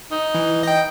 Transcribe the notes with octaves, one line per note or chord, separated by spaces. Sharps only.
D#4
E3
D#5 G5